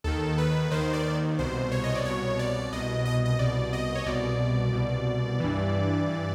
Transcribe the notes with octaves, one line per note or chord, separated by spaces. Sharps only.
D#2 D#3 A4
B4
D#2 D#3 C5
D5
C2 B2 C5
C#5
D#5
D5
C2 B2 C#5
D5
C2 B2 D#5
D#5
D#5
C2 B2 D5
D#5
C#5
C2 B2 D5
C2 B2
G2 E3
G2 E3